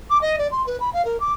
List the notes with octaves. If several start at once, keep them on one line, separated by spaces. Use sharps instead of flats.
D6
D#5
D5
C6
B4
B5
F5
A#4
D6